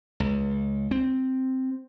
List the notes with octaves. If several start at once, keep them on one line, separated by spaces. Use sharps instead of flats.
C#2
C4